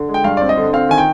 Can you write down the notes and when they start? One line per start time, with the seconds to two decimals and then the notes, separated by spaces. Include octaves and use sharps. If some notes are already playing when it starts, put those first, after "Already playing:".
Already playing: D3
0.09 G#3
0.14 G5
0.24 G2 F5
0.37 C4 D5
0.49 D#5
0.58 D3
0.73 C4 F5
0.89 D#3 G#5
0.98 G5